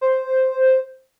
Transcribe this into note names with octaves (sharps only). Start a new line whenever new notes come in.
C5